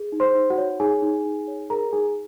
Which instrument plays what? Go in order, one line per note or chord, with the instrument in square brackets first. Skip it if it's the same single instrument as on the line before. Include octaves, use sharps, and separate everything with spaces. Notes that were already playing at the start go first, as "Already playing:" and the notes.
Already playing: [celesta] G#4
D#4
C5 C6
D#4
F#4 F#5
C#5
D#4 G#4 G#5
D#4
D#4
C#5
G#4 A#4 A#5
D#4 G#4 G#5